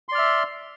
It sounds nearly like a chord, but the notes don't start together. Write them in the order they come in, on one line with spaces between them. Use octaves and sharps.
C6 D5 F6 E5